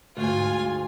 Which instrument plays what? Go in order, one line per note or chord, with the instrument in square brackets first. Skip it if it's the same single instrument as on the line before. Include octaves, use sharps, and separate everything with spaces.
[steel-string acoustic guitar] D2 [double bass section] G#2 [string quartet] F4 G#5